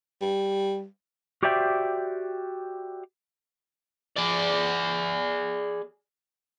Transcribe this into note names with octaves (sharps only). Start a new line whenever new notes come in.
G3
F#4 G4 C5 D5 E5 G5
G#4 D5